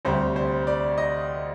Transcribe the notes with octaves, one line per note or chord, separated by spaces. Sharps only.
D2 C3 G3 C5
C5
D5
D#5